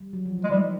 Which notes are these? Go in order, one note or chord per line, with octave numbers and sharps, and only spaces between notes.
G3
F#3
F3
E3
G#3
D#3 G3